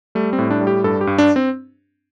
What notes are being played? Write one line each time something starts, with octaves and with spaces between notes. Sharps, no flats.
G3 A3
C4
A2
D4
G3
G4
G2 A4
G4
G2
D4
C4